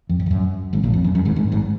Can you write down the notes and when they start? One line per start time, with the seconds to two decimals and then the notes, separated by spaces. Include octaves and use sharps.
0.09 F2
0.19 F#2
0.26 F2
0.31 F#2
0.73 G#1 G#2
0.84 A#1 A#2
0.93 F2
1.04 F#2
1.15 F#2
1.25 G#1 G#2
1.36 G#1 G#2
1.52 G#1 G#2